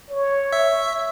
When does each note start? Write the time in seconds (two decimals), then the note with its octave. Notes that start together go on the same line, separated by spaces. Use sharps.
0.11 C#5
0.53 E5